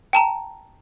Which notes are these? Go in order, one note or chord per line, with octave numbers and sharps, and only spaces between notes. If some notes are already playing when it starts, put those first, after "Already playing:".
G5 A5 A#5